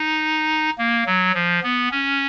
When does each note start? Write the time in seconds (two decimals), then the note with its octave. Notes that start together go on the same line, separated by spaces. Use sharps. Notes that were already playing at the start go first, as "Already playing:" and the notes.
Already playing: D#4
0.78 A#3
1.06 F#3
1.34 F3
1.63 B3
1.91 C#4